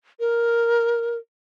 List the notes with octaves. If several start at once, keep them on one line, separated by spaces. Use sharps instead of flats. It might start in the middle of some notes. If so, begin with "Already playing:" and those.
A#4